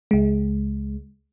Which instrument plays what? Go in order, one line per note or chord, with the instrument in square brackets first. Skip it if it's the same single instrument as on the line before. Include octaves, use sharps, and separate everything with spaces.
[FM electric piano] C#2 G#3